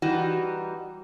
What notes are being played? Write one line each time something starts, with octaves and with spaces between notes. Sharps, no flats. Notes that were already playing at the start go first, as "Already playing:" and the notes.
E3 G3 D#4 F#4